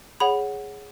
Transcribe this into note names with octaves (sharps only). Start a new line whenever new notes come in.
G#4 C#5 F#5 B5